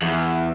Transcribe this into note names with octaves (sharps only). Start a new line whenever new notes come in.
E2